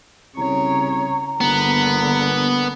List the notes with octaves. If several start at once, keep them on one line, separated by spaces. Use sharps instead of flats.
C2 C#3 C#5 A#5
G1 D3 A#3 B3